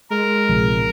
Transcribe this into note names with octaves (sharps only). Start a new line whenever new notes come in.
G#3 A#4
A#1 C3 F3